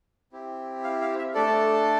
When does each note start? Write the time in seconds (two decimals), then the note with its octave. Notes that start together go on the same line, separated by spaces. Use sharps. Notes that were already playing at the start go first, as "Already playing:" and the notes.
0.32 C4 E4 G4
0.84 F5
1.01 F5
1.18 E5
1.34 A3 D4 A4 D5